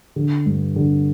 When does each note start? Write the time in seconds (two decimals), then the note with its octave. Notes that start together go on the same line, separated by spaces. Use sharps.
0.16 D3
0.46 G2
0.76 D3